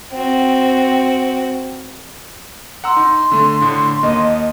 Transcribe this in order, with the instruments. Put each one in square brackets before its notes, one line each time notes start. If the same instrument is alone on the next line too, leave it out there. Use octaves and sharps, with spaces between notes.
[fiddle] C4 F#4
[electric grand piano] F#5 A#5 E6 [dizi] C6
[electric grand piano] D#4
D3 A3
A2 D3
[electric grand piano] D#2 A#3 [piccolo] D#5